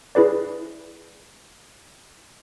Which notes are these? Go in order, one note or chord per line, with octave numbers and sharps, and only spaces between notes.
E4 G#4 B4 D5